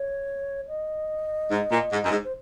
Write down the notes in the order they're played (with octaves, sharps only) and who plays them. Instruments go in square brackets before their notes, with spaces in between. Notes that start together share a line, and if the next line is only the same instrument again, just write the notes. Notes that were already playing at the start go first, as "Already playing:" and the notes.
Already playing: [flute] C#5
D#5
[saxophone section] G#2
A#2
G#2
F#2
G#2
[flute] C5